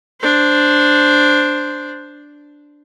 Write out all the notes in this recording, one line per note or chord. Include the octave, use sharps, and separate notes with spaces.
D4 C5